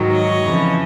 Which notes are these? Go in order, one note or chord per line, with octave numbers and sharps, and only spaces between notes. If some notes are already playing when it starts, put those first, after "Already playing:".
Already playing: G#2 D#3 F#3
C#5 D#5
F2 C#3 E3